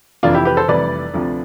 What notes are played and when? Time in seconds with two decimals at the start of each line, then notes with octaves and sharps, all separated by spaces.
0.23 F1 F2 E3 D4 F4
0.35 E4 G4
0.45 G4 B4
0.57 A4 C5
0.68 F1 F2 E3 G3 B4 D5
1.14 D2 C3 F3